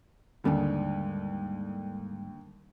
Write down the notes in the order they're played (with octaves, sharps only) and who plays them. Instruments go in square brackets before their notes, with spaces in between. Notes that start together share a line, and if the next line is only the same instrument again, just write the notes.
[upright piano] D#2 D3 [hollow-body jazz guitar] G#2 G3